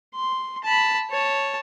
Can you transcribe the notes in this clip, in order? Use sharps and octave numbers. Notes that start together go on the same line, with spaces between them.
C6
A5 B5
C#5 A5